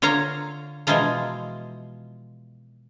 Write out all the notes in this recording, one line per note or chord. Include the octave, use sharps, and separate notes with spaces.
D3 F4 C#5 F5 A#5
B2 E3 F3 G#3 F4 A#5